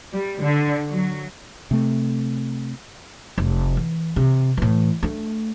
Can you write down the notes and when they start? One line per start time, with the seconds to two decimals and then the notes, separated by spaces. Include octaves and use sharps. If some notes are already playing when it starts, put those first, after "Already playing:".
0.11 G3
0.41 D3
0.89 F#3
1.71 C3 A3
3.38 F1
3.77 E3
4.16 C3
4.57 A2 E3
5.03 A3 D4